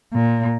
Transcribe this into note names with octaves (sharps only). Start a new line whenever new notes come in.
A#2